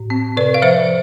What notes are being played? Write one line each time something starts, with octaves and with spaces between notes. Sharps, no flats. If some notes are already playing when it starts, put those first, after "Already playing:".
Already playing: A2
C4
C3 B4 D5
F5
F3 C5 E5